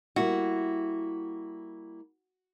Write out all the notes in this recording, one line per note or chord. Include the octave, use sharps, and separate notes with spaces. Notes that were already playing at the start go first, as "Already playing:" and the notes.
G3 A#3 E4 F#4